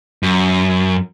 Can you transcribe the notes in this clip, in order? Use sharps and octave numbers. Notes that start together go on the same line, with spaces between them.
F#2